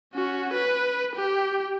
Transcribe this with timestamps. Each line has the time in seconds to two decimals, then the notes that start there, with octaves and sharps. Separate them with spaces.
0.14 C#4 F#4
0.54 B4
1.16 G4